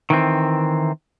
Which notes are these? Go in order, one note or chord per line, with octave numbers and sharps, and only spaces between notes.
D#3 E3 C4